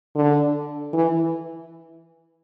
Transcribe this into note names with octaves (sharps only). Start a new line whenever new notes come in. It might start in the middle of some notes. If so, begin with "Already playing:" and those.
D3
E3